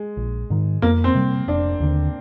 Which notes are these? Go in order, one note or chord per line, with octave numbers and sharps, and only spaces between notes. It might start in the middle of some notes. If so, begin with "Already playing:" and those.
Already playing: G#3
A#1
G#2 D#3
F2 A#3
C4
C3 G3
F1 D4
D#2 D3